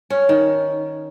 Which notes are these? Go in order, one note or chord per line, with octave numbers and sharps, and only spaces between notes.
C#4
D#3